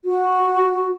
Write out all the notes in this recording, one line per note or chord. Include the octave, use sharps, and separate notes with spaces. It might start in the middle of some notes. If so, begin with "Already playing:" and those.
F#4